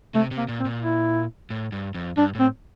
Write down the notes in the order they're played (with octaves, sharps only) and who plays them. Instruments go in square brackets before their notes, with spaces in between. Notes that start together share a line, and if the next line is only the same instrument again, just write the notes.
[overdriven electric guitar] C3 [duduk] A3
[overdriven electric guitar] C3
[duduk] A#3
[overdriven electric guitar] A#2
[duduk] C4
[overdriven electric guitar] A#2
[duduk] E4
[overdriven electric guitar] A2
G2
F2
[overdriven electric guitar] G2 [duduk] D4
[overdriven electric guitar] A2 [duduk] C4